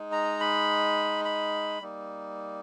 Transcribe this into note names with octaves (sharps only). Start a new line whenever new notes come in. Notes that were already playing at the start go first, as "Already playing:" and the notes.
Already playing: G#3 D#4
A#5
B5
B5
G3 A#3 D#4